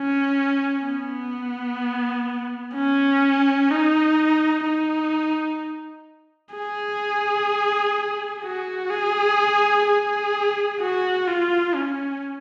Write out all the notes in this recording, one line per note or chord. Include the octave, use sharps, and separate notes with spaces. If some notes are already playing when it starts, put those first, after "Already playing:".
Already playing: C#4
B3
C#4
D#4
D#4
G#4
F#4
G#4
G#4
F#4
F4
C#4